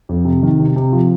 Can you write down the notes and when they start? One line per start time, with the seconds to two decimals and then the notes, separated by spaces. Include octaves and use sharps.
0.09 F2
0.25 C3
0.43 D#3
0.59 C3
0.76 C3
0.93 F3